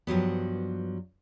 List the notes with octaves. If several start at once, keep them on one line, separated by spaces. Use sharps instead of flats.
G2 F3 F#3 B3